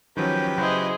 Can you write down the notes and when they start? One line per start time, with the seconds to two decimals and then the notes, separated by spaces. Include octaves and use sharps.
0.17 D#3 F3 F#3 C#4 G4 B4 G5
0.58 C#3 F#3 E4 F#4 G#4 C5 D#5